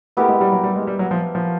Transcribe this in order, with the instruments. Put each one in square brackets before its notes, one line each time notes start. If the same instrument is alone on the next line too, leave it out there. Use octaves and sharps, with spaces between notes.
[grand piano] A3 [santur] B3 E4 G4 A#4
[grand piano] G#3
G3
F#3
G3
G#3
G3
F#3
F3
F3